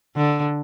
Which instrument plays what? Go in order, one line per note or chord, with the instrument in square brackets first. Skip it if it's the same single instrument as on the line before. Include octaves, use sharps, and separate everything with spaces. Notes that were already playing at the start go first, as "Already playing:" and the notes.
[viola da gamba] D3